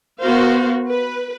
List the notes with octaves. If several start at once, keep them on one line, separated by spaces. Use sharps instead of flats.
B3 F#4 A#4 C5 F5
B4